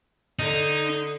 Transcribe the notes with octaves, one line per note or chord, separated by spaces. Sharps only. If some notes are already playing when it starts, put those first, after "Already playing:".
D3 D#4